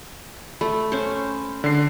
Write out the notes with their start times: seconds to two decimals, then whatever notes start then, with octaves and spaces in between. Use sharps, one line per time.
0.61 A3 B5
0.92 C#4 C5
1.64 D3 C7